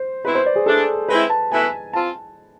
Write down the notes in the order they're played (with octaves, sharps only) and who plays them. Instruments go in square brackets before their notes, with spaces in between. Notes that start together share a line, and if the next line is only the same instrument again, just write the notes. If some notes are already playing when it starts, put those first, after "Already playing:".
Already playing: [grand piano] C5
[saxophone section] B2 G#3 C4 E4 [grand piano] B4
[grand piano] C5
D5
G#4
[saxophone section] E3 A3 D4 [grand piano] A4
[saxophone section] G#3 C4 E4 [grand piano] B4
[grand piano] A5
[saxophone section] B2 A3 E4 B4 E5 [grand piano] G#5
[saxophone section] C4 F4 [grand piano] A5